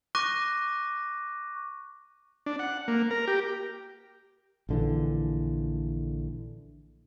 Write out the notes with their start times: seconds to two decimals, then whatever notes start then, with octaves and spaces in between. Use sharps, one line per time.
0.15 C#6 D6 F#6 A#6 D#7
2.46 D4
2.59 F#5
2.88 A#3
3.11 A#4
3.28 G4
4.69 A#1 D3 E3